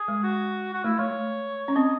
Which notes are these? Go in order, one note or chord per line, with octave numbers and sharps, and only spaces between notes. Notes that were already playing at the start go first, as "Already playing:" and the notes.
Already playing: G#4
G#3
F#4
F#4
A3 E4
A3 C#5
C#4
C4 D#5